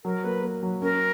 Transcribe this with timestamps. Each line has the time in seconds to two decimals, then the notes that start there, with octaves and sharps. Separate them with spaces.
0.05 F#3 A#4
0.24 A#3 B4
0.43 A#3
0.63 F#3
0.82 C#4 A#4